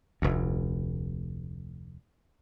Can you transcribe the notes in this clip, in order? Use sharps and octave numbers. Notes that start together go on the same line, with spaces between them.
F1 D2